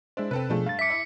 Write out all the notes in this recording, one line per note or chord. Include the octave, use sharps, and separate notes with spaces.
G#3 D4 E4 C5
C3 C4 A4 B4
B2 F3 A3 D4 G#4 A4
G2 F5 A6
E5 D6 B6 C#7
E4